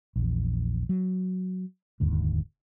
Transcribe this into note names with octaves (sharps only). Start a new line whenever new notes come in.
A#1 E2
F#3
F1 D#2 G#2 D3